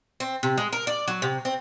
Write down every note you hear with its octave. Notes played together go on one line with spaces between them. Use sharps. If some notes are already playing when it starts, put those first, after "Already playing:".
C4
C3
G#3
A#4
D5
F#3
C3
C4